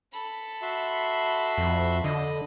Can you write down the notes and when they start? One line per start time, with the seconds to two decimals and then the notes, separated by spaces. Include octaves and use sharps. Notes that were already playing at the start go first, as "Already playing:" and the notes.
0.12 A4 B5
0.62 F#4 E5 C6
1.58 F2
2.04 D3 D#5